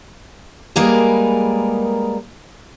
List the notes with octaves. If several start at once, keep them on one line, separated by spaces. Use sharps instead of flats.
G3 G#3 A#3 G#4 A#4 B4